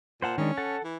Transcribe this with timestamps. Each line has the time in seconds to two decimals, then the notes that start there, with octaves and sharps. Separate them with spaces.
0.22 A#2 C5 F#5 A5
0.38 D#3 G#3 C#4 D4
0.57 A4 F#5 A5
0.84 E3